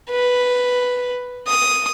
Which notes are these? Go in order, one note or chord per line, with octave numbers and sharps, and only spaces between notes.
B4
D#6